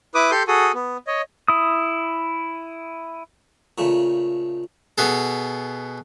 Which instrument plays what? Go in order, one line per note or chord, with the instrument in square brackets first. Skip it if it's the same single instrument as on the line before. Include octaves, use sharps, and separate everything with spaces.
[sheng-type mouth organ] E4 B4 D6 D#6
G4 A4 C6 G6
F#4 G#4 A4 D#6
B3
C#5 D#5
[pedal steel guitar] E4 D#6
[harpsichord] A#2 C#3 A3
B2 B3 G#4 A4